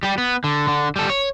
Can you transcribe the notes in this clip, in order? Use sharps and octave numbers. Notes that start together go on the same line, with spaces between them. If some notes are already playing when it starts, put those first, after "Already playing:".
G3 G4
B3
D3
D3
G3 A4
C#5